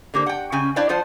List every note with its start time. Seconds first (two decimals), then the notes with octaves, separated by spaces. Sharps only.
0.14 D3 A#3 G4 C5
0.26 F#5 G5
0.52 C#3 C#4 G5 G#5
0.76 D4 E4 C5 D5 F5 G5
0.89 F3 F4 C5 F#5